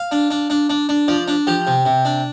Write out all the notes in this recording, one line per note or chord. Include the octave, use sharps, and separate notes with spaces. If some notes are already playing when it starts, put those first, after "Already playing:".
Already playing: F5
D4
D4
D4
D4
D4
F3 D5
D4
F3 G4
C3
C3
D4